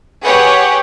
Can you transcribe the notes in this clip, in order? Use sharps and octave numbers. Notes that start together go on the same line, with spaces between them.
G4 G#4 B4 C#5 F#5